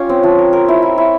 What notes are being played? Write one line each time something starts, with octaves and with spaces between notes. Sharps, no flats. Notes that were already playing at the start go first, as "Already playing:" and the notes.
Already playing: C#4 F4 G4
C4
F3
A#4
A#4
E4
E4
E4